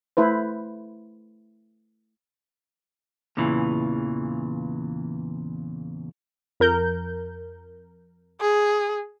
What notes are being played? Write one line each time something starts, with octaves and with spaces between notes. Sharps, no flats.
A3 E4 B4 C5
E2 A#2 C#3 E3
F2 A#4 G6
G#4